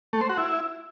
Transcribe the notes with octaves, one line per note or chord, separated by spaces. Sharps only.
A3
C5
F#4
E4